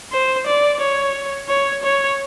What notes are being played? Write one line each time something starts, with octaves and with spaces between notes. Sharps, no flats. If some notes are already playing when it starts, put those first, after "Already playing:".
C5
D5
C#5
C#5
C#5